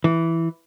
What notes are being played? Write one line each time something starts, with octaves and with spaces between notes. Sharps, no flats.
E3